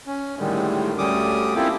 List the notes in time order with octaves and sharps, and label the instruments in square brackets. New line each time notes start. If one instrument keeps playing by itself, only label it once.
[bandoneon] C#4
A2 D3 D#3 G3 G#3
D2 D3 G3 C#4 D6 D#6
A#3 C4 E4 F4 G4 A4